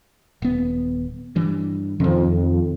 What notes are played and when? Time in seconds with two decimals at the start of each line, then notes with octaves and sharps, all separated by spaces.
0.42 D#1 B3
1.36 G2 E3
2.00 F2 C3 D#3